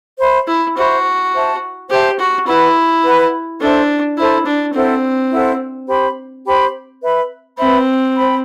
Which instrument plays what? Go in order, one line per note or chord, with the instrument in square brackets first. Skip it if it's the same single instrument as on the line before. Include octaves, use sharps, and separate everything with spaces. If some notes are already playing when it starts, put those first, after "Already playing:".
[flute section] C5 E5 B5
[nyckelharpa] E4
[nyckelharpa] F#4 [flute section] C5 E5 B5
[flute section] C5 E5 A5
[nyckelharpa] G4 [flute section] C5 E5 A5
[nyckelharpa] F#4
[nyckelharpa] E4 [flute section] B4 F#5 B5
[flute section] B4 F#5 B5
[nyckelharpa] D4 [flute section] A4 C5 E5
[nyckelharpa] E4 [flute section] A4 C5 E5
[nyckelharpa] D4
[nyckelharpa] C4 [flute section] E4 A4 C5 F#5
[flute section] E4 A4 C5 F#5
G4 C5 G5 B5
G4 C5 G5 B5
B4 E5 B5
[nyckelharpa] C4 [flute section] B4 E5 B5
[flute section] C5 G5 B5